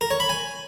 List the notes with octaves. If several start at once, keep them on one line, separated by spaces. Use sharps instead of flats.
A#4
C#5
B5
G#5